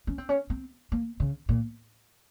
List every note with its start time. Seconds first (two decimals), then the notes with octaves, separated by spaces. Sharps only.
0.07 C#4
0.18 C4
0.29 C#4
0.50 C4
0.92 A#3
1.20 C#3
1.49 A#2